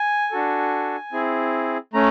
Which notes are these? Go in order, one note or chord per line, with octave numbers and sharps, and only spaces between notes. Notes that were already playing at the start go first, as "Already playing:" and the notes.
Already playing: G#5
D4 F#4 A4
C4 E4 G#4
A3 C#4 A#5